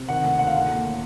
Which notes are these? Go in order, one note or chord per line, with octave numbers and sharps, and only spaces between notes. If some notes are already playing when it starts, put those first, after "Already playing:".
Already playing: C3
D#3 F#5
D2 F#5
D2 F#5
F5
A2 F#5
A#3
A2